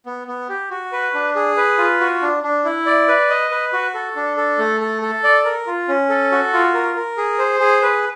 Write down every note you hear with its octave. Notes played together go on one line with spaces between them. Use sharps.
B3
B3
G4
F#4
B4
D4
G#4
B4
F4
F#4
D4
D4
E4
D5
B4
D#5
B4
F#4
A4
D4
A4
A3
A4
A4
D5
A#4
F4
C#4
A4
F#4
F4
A#4
A#4
G#4
C5
G#4
B4